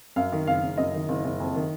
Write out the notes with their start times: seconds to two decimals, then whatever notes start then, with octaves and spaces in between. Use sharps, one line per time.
0.16 F#2 F5
0.32 D#3
0.47 F#1 F5
0.62 F#1
0.78 F#2 D#5
0.93 D#3
1.09 F#1
1.24 F#1
1.40 F2
1.55 D#3